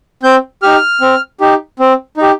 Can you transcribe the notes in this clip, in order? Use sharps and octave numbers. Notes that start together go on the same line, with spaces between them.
C4 G6
D#4 G4 F6
C4
D#4 G4
C4
D#4 G4